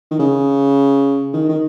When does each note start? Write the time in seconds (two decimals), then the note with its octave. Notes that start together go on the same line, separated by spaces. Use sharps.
0.11 D#3
0.19 C#3
1.34 D#3
1.49 D#3